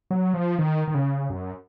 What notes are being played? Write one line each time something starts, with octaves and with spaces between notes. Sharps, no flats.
F#3
F3
D#3
D#3
C#3
F#2